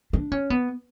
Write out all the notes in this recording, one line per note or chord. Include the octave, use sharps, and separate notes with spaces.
D4
C#4
B3